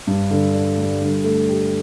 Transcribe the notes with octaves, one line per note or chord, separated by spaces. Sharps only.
G2
D3
D4
G3
D3
A3
G4